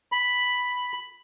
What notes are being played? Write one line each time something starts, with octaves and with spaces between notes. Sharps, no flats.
B5